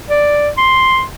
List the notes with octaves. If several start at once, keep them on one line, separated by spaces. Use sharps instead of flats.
D5
C6